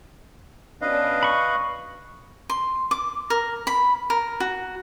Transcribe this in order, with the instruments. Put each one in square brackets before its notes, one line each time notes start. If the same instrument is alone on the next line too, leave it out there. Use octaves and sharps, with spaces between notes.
[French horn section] B2 C#4 D4 [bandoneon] B4 D#5 F5
[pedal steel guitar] B5 C#6
[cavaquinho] C6
D6
A#4
B5
A#4
F#4